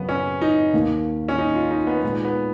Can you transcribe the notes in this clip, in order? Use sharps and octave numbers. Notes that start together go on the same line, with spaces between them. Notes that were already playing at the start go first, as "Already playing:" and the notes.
Already playing: F#2 C#3 F#3 B3
C#4
D#4
D#2 D#3 A#3
C#4
D#4
F4
D#4
B3
A#2 G#3 B3 D#4
B3